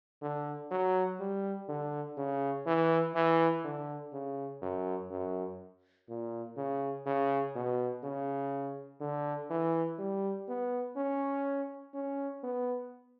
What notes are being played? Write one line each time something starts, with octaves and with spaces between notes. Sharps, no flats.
D3
F#3
G3
D3
C#3
E3
E3
D3
C#3
F#2
F#2
A#2
C#3
C#3
B2
C#3
D3
E3
G3
B3
C#4
C#4
B3